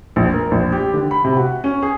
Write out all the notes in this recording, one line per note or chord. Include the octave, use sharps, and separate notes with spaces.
A#1
A#4
A#1
G4
D3
B5
C3
F#4
C#4
G#4